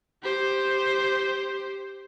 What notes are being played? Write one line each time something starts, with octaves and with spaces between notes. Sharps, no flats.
G4 C5